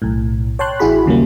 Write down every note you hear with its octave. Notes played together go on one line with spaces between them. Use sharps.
B1 A2
C#5 G5 A5 C6 F#6
A1 E4 F#4 G#4 B5
D#2 C#3 F#3 G3 A#3